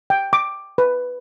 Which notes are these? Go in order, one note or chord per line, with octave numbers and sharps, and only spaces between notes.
G5
D6
B4